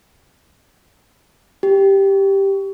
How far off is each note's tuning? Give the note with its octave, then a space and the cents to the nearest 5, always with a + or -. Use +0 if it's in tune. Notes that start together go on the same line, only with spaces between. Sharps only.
G4 +0